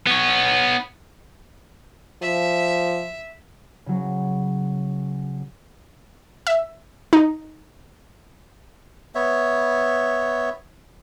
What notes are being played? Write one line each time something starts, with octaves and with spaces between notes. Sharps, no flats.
B3 C#5
F3 E5
C#3 F#3
E5
D#4
B3 C#5 E5